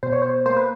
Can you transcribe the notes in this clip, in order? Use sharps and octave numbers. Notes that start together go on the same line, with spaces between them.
B2 C5
C#5
C5
A#3 C5
B4